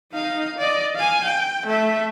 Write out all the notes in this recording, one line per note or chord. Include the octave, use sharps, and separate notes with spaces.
D#4 F5
D5 D#5
F5 G#5
G5
A3 E5